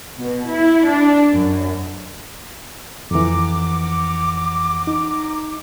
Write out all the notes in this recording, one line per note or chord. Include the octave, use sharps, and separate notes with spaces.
B2
E4
D4
F#2
F2 E3 F#5 A#5 D6
D#4